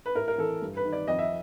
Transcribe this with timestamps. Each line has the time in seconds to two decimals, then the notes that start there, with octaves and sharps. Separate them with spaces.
0.06 B4
0.15 A2 A#4
0.28 A#4
0.38 E3 A4
0.62 G2
0.77 B4
0.85 D#3
0.93 D5
1.07 F2 D#5
1.19 E5